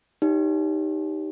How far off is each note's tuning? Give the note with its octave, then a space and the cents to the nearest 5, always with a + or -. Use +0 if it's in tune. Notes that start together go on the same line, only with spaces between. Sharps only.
D#4 +0 G4 +0 C#5 +25